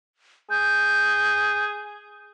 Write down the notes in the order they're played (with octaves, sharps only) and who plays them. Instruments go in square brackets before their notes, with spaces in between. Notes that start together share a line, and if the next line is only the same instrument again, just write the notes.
[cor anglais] G#4 [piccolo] G6